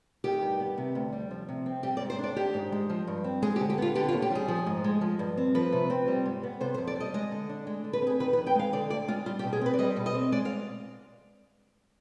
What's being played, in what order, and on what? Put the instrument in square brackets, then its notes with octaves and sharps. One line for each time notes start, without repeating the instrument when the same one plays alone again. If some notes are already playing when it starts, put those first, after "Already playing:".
[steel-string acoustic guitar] D#3 G4
G2
B3
C3
D2
G3
F3
C3
C4
G3 G4
D5
G#2
C5
D4 D5
D#3 G4
G#2
G#3
F3
G2
C4
G#3 G#4
G4
D3
G4
B3 F4
D3 G4
F4
D#2
G4
G3 G#4
F3
G#2
G#3
F3
G2
C4
F3 B4
C3
C4
G3
G#2
B3
C3 C5
C5
F2
D5
G3 D#5
G#3 D#5
D3
D4
G#3
D3
B4
C4 G#4
D#3 B4
B4
F2
G5
G#3 F5
D3 D5
D2 D5
G#3 F4
G3 F4
G4
B2
G#4
C4 B4
D5
G3 D#5
B2
D#5
C4
G#3 D5
F5